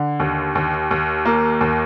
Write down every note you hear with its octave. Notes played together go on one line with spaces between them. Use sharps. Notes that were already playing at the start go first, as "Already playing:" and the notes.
Already playing: D3
D#2
D#2
D#2
A#3
D#2